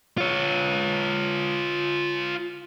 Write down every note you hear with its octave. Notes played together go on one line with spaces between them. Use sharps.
F4 C#5